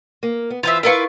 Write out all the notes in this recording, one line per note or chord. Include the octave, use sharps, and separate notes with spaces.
A#3
B3
E3 F4 C5 E5
E4 F4 A#4 B4 F5 C#6